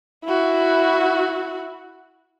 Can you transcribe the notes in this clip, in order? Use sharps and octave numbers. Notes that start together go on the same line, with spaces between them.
E4 F#4